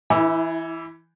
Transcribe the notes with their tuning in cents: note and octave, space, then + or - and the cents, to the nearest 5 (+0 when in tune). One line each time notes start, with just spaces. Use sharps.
E3 +0 E4 -30